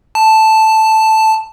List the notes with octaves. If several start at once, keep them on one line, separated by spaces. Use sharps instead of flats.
A5